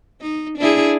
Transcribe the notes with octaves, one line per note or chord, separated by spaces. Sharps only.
D#4
D4 E4 G#4